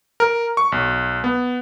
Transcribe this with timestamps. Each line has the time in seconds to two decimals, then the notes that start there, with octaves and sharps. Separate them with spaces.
0.20 A#4
0.57 C#6
0.72 B1
1.24 B3